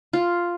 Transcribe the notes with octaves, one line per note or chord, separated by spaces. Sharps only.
F4